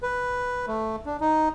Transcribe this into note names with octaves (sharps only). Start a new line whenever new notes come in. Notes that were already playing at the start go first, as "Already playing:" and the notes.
B4
A3
D4
D#4